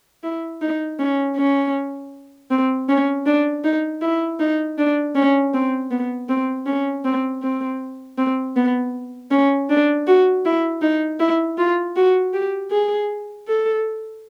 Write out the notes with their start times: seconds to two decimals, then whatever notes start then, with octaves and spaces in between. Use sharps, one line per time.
0.24 E4
0.62 D#4
0.99 C#4
1.37 C#4
2.51 C4
2.89 C#4
3.26 D4
3.64 D#4
4.02 E4
4.40 D#4
4.78 D4
5.15 C#4
5.54 C4
5.91 B3
6.29 C4
6.66 C#4
7.05 C4
7.43 C4
8.18 C4
8.56 B3
9.31 C#4
9.70 D4
10.07 F#4
10.45 E4
10.82 D#4
11.20 E4
11.58 F4
11.96 F#4
12.33 G4
12.71 G#4
13.48 A4